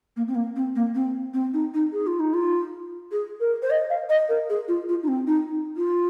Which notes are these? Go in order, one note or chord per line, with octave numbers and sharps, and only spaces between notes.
A#3
C4
A#3
C4
A#3
C4
C4
D#4
D#4
G#4
F4
D#4
F4
G#4
A#4
C5
D#5
F5
D#5
A#4
G#4
F4
F4
D#4
C4
D#4
F4